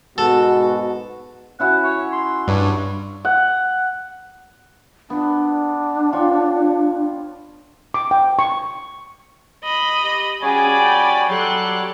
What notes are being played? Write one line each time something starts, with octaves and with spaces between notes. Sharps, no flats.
G#2 B2 F#4 A4
C#4 E4 F#4 F#5
C#5
C6
G2 D4 C#5
F#5
B3 D4
F4 C#5 G5
D6
G5
C#6
D#5 B5
G4
G3 C#4 F#4 G#4 C#5 D5 G#5 B5
G5
F#3 G4 A4 C6 F#6